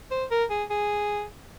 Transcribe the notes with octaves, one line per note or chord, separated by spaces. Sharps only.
C5
A#4
G#4
G#4